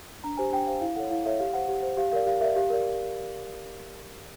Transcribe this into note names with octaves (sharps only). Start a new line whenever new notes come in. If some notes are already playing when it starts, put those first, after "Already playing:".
D4 A#5
G4 C5 G#5
D4 G5
G4 C5 F5
E4 F5
A4 C#5 F#5
E4 F5
A4 C#5 E5
G4 F5
C5 F#5
G4
C5
G4 F5
A#4 D5 F5
G4 F5
A#4 D5 E5
G4 F5
A#4 D5